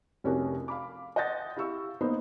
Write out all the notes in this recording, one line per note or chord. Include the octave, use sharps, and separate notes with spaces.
F1 C2 C#4 F#4 G4 A#4
F5 B5 D6
D#5 F#5 C6 G6 A6 A#6
E4 G4 F5 C#6 E6
A#3 B3 D#4 B4 C5